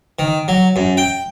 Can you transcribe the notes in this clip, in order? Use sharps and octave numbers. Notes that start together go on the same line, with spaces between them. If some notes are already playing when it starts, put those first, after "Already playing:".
D#3
F#3
F#2
G5